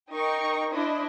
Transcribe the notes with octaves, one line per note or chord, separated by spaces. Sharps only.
D#4 A#4 G5 C#6
D4 E4 C5 D#5